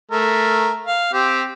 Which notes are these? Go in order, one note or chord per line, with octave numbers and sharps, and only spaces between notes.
A3 A#4
F5
C4 G4